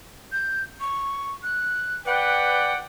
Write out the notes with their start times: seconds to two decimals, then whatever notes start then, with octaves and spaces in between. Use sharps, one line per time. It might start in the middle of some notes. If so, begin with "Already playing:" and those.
0.32 G6
0.80 C#6
1.43 F#6
2.06 B4 D5 F#5 G5